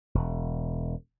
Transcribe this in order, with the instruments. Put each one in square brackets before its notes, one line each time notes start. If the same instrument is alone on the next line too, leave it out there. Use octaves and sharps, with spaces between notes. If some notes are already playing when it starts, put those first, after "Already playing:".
[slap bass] E1